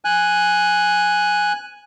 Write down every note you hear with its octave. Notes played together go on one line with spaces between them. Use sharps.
G#5 F#6